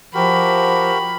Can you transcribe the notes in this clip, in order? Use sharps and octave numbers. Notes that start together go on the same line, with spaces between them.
F3 F#4 G4 A#4 B5